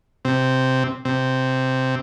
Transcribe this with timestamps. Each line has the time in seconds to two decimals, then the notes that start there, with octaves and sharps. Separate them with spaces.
0.25 C3
1.05 C3